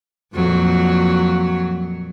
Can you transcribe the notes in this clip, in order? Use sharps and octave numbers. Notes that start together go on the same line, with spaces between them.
F2 A#2 F#3